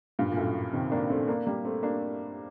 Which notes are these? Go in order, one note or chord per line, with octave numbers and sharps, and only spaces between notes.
G2 A#2
A#2
F#2 A2
C3 D#3
A#3 D4
A3 C4
A#3 D4
G3 A#3
A3 C4
A#3 D4